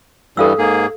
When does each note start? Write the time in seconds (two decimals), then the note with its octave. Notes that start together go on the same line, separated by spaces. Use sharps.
0.37 G2 E3 G3 A4 F5 E6
0.58 G#2 A#3 G#4